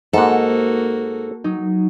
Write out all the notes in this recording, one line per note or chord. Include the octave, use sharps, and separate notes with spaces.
G#2 A#3 F#4 A4 F#5
F#3 D#4